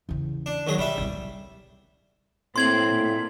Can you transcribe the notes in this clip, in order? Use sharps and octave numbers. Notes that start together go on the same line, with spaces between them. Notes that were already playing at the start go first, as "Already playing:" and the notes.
E2 C#3
D4
D#2 F#3 G#4
B2 G3 E5
C2 B2
A2 A#3 C4 C6 G#6 F#7
A#2